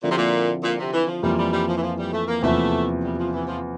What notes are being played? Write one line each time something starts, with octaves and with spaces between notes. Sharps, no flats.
A#2 D3 F3 C4 E4
C3
A#2
A#2
C3
E3
F3
F2 E3 G3 A#3 F4
G3
G3
F3
E3
F3
G3
A3
A#3
E2 C3 F3 A3 A#3 E4
G3
F3
E3
F3